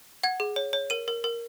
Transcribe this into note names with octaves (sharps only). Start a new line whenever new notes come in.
F#5 G#6
G#4
C#5
C#5
A#4 D#7
A#4
A#4